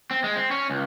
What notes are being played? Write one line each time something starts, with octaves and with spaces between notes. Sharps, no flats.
C4
G#3
C4
C#4
C#2